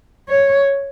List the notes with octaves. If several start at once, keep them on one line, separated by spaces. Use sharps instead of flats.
C#5